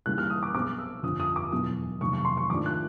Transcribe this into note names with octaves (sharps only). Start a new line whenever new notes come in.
D#2 C#3 E3 G3 F#6
F6
D#6
D6
B1 B2 G#3 C4 D6
E6
G1 F2 D3 F3 D#6
D#6
D6
E2 B2 F#3 D#6
F1 D#2 D#3 F#3 C#6
C#6
C6
C#6
G#1 G#2 F3 A3 D4 D6
F#6